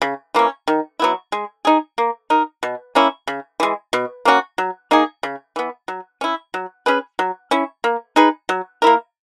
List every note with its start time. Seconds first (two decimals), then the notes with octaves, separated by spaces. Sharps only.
0.02 C#3
0.35 E3 A#3 C#4
0.68 D#3
1.00 F#3 B3 E4
1.32 G#3
1.65 D#4 G#4
1.98 A#3
2.30 D#4 A#4
2.63 B2
2.95 A#3 C#4 E4
3.27 C#3
3.60 E3 G#3
3.93 B2
4.25 A#3 C#4 F#4
4.58 F#3
4.91 A#3 D#4 G#4
5.23 C#3
5.56 E3 B3
5.88 F#3
6.21 C#4 E4
6.54 F#3
6.86 C#4 G#4 B4
7.19 F#3
7.51 C#4 E4
7.84 A#3
8.16 D#4 G#4 B4
8.49 F#3
8.82 A#3 E4 A#4